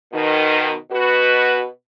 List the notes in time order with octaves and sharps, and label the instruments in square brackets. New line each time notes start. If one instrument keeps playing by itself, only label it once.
[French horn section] B2 D#3
B2 F#4 B4